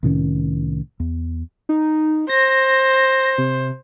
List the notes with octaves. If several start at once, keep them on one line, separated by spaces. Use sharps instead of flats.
C2 A2 D#3 C#4
E2
D#4
C5 A#6
C3